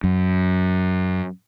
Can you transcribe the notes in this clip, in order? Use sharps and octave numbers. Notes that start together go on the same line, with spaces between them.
F#2